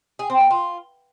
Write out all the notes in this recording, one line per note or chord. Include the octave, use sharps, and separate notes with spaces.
G#4
C4
B3
F4